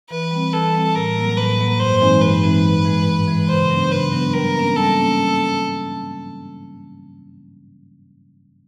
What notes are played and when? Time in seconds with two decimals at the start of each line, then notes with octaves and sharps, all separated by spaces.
0.10 E3 B4
0.31 G3 C4
0.53 E3 A4
0.74 G3 C4
0.95 A2 A#4
1.16 F#3 A#3
1.37 A2 B4
1.58 F#3 A#3
1.80 G2 C5
2.01 E3 G#3 C4 D#4
2.22 G2 B4
2.43 E3 G#3 C4 D#4
2.64 G#2
2.85 E3 G#3
3.07 G#2
3.28 E3 G#3
3.49 C#3 C5
3.70 F#3 B3 D4
3.91 C#3 B4
4.13 F#3 B3 D4
4.34 G3 A#4
4.55 A#3 C#4
4.76 G3 A4
4.98 A#3 C#4